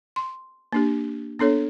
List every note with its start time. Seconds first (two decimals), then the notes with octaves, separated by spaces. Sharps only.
0.16 C6
0.73 A#3 D4 G4
1.39 B3 D4 A4 C#5